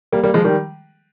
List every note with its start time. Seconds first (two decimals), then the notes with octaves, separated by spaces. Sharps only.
0.12 G3 A#3
0.23 G3 A#3
0.34 F3 G#3
0.44 D#3 G3